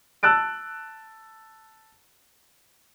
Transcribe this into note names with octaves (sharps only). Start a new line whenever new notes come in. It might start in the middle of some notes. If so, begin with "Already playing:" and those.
A5 E6 F#6 A6 D7